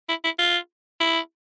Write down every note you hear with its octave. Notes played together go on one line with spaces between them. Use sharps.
E4
E4
F4
E4